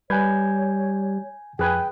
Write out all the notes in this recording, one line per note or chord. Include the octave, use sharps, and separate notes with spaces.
G3 B4 C#5 G#5 G6 G#6
F2 G#4 B4 G5 G#5 F#6